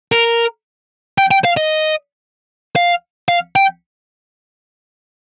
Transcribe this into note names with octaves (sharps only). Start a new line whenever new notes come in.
A#4
G5
G5
F5
D#5
F5
F5
G5